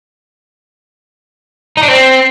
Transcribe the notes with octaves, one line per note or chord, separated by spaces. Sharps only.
D#4
D4
C4